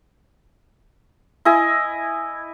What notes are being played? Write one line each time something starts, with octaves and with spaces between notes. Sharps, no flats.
E4 D#5 G#5